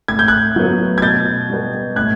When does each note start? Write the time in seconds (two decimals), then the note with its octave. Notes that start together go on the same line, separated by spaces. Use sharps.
0.08 A2 G#6
0.19 G6
0.28 F#6 G#6
0.56 F#3 B3
0.98 G#6
1.02 B2 G6 A6
1.50 G3 B3
1.96 A2 F#6 G#6